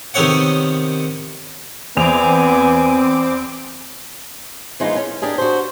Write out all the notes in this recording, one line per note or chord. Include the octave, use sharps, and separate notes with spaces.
C3 D#3 B3 C4 C#5 F#5
E2 B3 C4 G#5 D6 F7
E3 F3 G#3 A#3 D#4 F4
C#4
D4 G4 G#4 A#4
F#4 C5